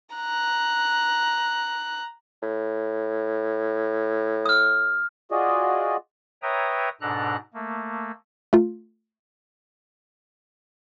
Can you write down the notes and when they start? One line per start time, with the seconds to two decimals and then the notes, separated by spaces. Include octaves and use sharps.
0.15 A#5 F#6
2.42 A2
4.46 D#6 F6
5.31 F4 F#4 G#4 D5 D#5
6.42 B4 C#5 E5 G5 A#5 D#6
7.01 G#2 B2 D4 A4 A#5 F#6
7.54 A3 A#3
8.53 A3 F4